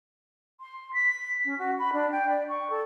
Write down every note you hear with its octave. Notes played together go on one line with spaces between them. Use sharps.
C6
B6
C#4
F#4
B5
D4
G5
D5
C#6
A4